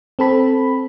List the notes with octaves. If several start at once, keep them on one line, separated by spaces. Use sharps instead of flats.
C4 A4 B5